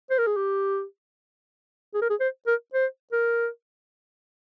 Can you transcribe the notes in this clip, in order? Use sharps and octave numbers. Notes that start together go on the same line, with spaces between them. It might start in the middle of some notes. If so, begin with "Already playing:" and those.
C5
A#4
G#4
G4
G#4
A#4
G#4
C5
A#4
C5
A#4